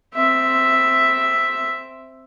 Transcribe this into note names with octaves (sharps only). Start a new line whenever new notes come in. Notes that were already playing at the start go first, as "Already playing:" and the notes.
C4 E5